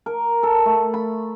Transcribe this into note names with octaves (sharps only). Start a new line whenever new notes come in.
A#4
A4
A3
B5